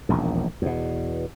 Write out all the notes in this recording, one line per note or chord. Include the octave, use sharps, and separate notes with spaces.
E1 A#1 D#2
E2 B2